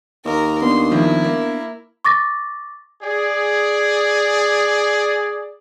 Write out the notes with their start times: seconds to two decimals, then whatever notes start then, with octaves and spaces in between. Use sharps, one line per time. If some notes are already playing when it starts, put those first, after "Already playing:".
0.25 D#2 A#4 A#5
0.62 B3 D4 C6
0.91 D#3 F3 E4 A#4
1.24 A#3
2.05 C#6 D6 A6 A#6
3.01 G#4 D5